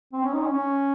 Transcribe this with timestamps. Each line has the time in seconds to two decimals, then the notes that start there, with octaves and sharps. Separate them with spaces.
0.13 C4
0.23 C#4
0.33 D#4
0.42 C#4
0.52 C#4